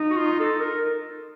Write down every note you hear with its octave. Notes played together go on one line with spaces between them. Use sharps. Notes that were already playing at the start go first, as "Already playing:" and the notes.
Already playing: D#4
F#4
F4
A4
A#4